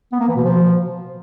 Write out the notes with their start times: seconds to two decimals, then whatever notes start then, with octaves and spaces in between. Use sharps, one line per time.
0.12 B3
0.20 A#3
0.28 E3
0.36 B2
0.44 F3